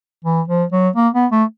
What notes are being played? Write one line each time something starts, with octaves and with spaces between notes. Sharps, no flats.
E3
F3
F#3
A#3
B3
A3